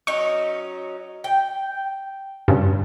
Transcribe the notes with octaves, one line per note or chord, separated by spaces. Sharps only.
F#3 C#4 D#4 C#6
G5
G2 C#3